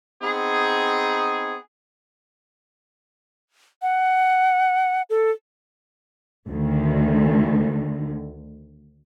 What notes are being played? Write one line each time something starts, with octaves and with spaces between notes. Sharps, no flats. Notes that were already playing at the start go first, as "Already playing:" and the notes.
B3 C4 D#4 G#4
F#5
A4
D2 D3 D#3